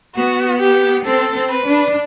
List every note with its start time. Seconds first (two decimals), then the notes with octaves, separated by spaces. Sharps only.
0.15 B3 F#4
0.60 G4
1.05 C4 A4
1.35 C4
1.50 B4
1.66 D4